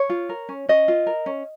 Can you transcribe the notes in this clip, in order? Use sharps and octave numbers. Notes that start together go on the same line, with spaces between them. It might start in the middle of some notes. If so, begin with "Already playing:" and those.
Already playing: C#5
F4
A#4
C#4
C#4 D#5
F4
A#4
C#4